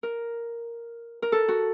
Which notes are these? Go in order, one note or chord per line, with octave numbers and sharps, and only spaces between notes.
A#4
A#4
A4
F#4